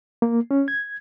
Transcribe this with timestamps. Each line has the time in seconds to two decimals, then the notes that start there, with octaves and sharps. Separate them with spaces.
0.22 A#3
0.51 C#4
0.68 G#6